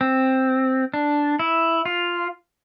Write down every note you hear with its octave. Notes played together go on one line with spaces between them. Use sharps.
C4
D4
E4
F4